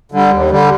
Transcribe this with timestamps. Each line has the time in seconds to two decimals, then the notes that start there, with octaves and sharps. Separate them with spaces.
0.12 D3 G3
0.31 D#2
0.51 D3 G3